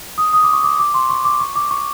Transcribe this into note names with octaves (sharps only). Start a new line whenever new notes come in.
D#6
D#6
D6
C#6
D6
D6
C6
C#6
D6
C#6
D6
C#6